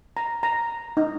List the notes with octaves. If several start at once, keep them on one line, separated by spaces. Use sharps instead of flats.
A#5
A#5
D#4